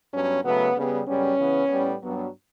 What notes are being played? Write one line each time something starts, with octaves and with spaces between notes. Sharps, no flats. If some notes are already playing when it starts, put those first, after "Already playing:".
G2 F#3 B3 C#4
C#3 F#3 A3 B3
C#3 G3 B3
F#2 C#3 G3 B3 C#4
C#3 E3 B3
A2 G3 B3
G2 F#3 B3